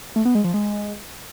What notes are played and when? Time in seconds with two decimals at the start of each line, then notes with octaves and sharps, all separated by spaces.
0.16 A3
0.25 B3
0.35 G#3
0.44 F3
0.54 G#3